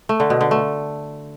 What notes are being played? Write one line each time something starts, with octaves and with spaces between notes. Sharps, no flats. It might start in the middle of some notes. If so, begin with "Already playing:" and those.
A3
D3
B2
D3
A3